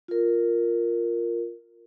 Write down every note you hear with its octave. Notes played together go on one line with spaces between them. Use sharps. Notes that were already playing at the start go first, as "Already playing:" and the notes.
F4 A#4